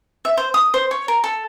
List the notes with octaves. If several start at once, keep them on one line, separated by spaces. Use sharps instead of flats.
E5
C5
D#6
C5
C#5
A#4
A4